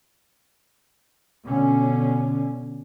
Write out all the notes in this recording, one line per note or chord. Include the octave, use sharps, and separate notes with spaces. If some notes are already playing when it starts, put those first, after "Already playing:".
B2 D3 C#4